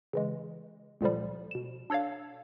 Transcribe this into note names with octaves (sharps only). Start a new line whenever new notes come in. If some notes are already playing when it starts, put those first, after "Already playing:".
C#3 E3 G#3
C#2 A#2 D3 F3 G3
B2 E7
D4 A4 C#5 D5 F5